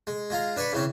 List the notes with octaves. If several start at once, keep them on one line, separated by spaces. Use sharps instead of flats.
G#3
G#3 F4 A#5
D4 B4 G#5 B5 C#6
C#3 E3 C4 C#4